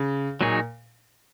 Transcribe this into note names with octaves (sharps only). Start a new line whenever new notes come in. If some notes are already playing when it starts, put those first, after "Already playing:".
Already playing: C#3
A#2 F#3 D#4 G#4 C#5